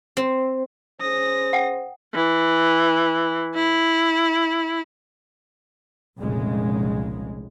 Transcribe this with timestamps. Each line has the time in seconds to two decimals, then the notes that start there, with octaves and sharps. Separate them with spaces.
0.17 C4
1.00 C#4 G#4 C5 D#6 A#6
1.53 F#5 G5
2.15 E3
3.55 E4
6.17 F1 C2 A#2 C#3 G#3